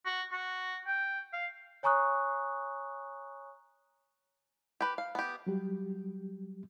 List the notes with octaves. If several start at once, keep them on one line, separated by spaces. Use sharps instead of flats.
F#4
F#4
G5
F5
C#5 G#5 A#5 C#6 D#6 F#6
G4 B4
F5
B3 G4
F#3 G3 G4